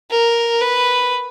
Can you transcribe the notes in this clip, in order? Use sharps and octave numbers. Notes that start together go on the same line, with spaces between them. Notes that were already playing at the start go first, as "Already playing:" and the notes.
A#4
B4